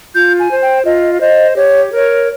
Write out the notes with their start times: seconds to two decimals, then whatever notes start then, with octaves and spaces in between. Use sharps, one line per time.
0.15 F4 G6
0.39 G#5
0.50 C5
0.62 G5
0.86 F4 D#5
1.20 C5 D#5
1.56 G4 C#5
1.91 A#4 C#5